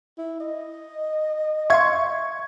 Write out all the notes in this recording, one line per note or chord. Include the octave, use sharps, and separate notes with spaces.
E4
D#5
E5 F5 C6 C#6 G#6